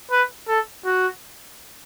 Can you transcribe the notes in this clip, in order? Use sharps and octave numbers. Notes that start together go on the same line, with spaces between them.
B4
A4
F#4